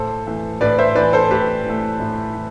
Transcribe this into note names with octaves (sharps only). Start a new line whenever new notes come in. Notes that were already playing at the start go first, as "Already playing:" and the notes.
Already playing: A2 A4 C5
E3 A3
A2 B4 D5
C5 E5
E3 A3 B4 D5
A4 C5
A2 G4 B4
E3 A3
A2
E3